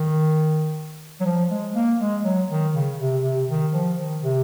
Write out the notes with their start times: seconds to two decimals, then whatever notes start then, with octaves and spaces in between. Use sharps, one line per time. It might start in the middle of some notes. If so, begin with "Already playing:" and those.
Already playing: D#3
1.20 F#3
1.25 F3
1.51 G#3
1.75 A#3
1.99 G#3
2.25 F#3
2.50 D#3
2.73 C#3
2.99 C3
3.23 C3
3.49 D#3
3.73 F3
3.98 D#3
4.22 C3